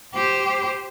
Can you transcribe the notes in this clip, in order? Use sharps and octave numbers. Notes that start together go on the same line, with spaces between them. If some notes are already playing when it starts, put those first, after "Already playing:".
G4 C5